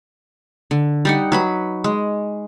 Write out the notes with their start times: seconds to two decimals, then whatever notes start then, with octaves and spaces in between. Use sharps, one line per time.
0.71 D3
1.05 G3 D#4 F#5
1.32 F#3 B4 B5
1.84 G#3